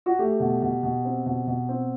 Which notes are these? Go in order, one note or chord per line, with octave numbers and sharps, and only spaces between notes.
F#4
A3 G4
B2
B2
B2
C4
B2
B2
C4